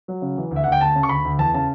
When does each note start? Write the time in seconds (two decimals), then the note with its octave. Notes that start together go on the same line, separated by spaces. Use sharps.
0.08 F#3
0.22 C#3
0.37 E3
0.51 D2
0.56 E5
0.64 D2 F#5
0.72 G5
0.81 D2 A5
0.95 C#3
1.03 C#6
1.09 D2 B5
1.25 D2
1.38 E2 A5
1.54 C#3 A5